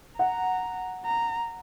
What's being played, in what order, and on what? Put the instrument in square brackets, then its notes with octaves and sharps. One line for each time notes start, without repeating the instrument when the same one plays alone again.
[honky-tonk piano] F#5 [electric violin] A#5
[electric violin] A#5